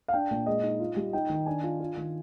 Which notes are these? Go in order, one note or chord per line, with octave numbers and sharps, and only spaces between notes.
F5
D4 G5
A#2
G#3 D#5
D#4
F4
G3
D#4 G5
D#3
D4 G#5
F4
F4
D#3